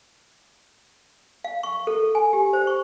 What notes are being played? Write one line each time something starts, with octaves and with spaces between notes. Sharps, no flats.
F5
C#6
A4
G#5
G4
C5
C#6